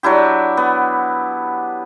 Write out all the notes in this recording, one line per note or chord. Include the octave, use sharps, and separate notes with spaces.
F#3 D4 E4 G4
B3